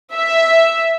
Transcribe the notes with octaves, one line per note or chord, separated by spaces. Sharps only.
E5